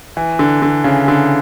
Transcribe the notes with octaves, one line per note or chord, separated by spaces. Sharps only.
E3
D3
D3
C#3
D3